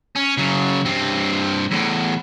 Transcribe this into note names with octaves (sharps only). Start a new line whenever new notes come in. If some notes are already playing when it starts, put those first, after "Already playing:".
C#4
C#3 F#3
G2 C4
E2 A2